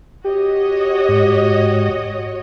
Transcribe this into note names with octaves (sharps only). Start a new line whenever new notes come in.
F#4 G4 C#5 D#5
G#2